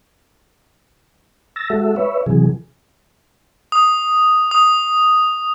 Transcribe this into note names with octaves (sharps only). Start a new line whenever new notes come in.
E6 A6 A#6
G#3 F#4 A4 E5
B4 C#5 E5
C3 E3 F#3 G#4
D#6
D#6